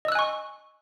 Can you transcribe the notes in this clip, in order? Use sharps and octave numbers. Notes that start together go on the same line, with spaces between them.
D#5 G#5 C#6 E6 F#6